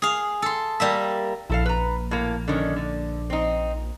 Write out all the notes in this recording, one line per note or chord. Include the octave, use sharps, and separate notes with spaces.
G#4 F5
A4 C6
G3 A#3 E5
A#1 E4 A4 F5
B4 A#5
A2 A#3
D3 D#3 C#4
D3
C4 D#4